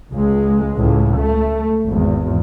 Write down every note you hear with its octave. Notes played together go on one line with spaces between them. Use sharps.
C#2 G#3
C#2 A2
A3
G#1 E2